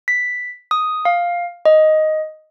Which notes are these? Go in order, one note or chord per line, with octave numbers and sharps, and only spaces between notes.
B6
D#6
F5
D#5